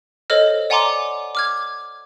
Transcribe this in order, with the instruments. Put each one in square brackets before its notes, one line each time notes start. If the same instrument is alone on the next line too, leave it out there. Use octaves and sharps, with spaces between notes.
[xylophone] A4 C5 C#5 D#5 F6
D5 F#5 G#5 A#5 C6 D6
D6 F6 G#6